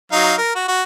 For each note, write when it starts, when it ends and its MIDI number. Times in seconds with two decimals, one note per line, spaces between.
0.12 0.34 54
0.12 0.34 63
0.12 0.34 77
0.38 0.53 70
0.55 0.68 66
0.68 0.83 66